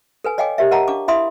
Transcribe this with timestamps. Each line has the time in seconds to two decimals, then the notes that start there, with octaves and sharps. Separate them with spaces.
0.24 A4 B4 G#5
0.38 C#5 D#5 F5 G5 G#5 D6
0.58 G4 A#4 C#5 E5
0.71 A#4 D#5 F5 F#5 A5 A#5
0.88 D4 F5 C#6 D6
1.08 E4 E5 F5 B5 C6 D#6